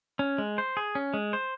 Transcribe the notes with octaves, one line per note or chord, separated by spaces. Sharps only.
C#4
G#3
C5
G#4
C#4
G#3
C5